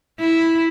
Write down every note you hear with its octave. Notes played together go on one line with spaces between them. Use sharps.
E4